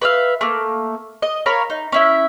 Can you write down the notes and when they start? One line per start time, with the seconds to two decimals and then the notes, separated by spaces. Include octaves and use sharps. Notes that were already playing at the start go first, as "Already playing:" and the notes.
0.02 B4 C#5 E5 F5
0.41 A3 A#3
1.22 D#5
1.46 A#4 C#5 F5 B5
1.70 D#4
1.92 C#4 E4 E5